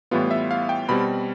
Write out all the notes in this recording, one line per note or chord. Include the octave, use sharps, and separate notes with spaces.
A2 E3 G3 B3 F4
E5
F5
G5
B2 G3 C4 B5